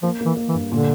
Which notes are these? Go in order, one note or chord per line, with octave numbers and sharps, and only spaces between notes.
F3 A#3
E3 A#3
A#3
E3
G2
A#2 D3